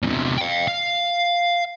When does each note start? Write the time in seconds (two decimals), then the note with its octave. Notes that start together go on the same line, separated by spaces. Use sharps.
0.02 E2 C3
0.38 F5 G5
0.67 F5